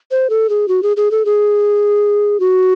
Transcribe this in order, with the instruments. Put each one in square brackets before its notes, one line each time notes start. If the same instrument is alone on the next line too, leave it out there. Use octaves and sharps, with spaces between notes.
[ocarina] C5
A4
G#4
F#4
G#4
G#4
A4
G#4
F#4